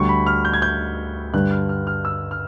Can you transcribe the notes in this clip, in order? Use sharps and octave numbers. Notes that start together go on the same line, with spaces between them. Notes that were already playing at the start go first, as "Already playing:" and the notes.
Already playing: D2 D3 G3 C#6
B5
F6
G6
G#6
G6
G2 D3 G3 F#6
F6
F6
F6
E6
F6